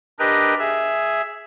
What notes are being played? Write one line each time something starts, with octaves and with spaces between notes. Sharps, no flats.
D4 G4 A#4 B4 D#5
G#4 E5